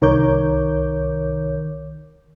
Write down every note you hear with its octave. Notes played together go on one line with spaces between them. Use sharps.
C2 D#3 A#4 C#5 D6 G6